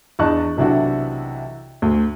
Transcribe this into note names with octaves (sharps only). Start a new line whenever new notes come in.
E2 D4 D#5 A5 C#6 F#6
B1 C3 E3 D4 E4 F#4
D2